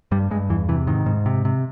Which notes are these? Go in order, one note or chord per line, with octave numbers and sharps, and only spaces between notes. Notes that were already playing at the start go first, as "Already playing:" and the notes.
G2 G3
G2 G#3
E2 E3
C3 E3
G#2 D#3
G#2
C3
C3